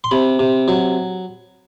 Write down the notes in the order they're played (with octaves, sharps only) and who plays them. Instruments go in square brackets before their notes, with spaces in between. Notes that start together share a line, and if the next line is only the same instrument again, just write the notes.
[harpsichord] C6
C3 B5
C3
F#3